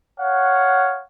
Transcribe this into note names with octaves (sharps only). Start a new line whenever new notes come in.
C#5 F5 F#5